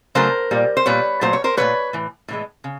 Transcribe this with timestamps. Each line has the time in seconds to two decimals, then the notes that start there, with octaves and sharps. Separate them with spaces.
0.15 C#3 F#3 A3 A#4 C5
0.51 A#2 G3
0.77 C5
0.86 A#2 G3 B4 C#5
1.21 A#2 F#3 A3 C5
1.33 C#5
1.44 A#4 C5
1.57 A#2 F#3 A3 B4 C#5
1.93 A2 E3
2.28 A2 E3 G#3
2.64 C#3